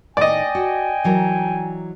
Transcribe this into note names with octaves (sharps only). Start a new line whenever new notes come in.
A2 D#3 D5 D#5 G5 G#5
F#4
E3 F#3 A#4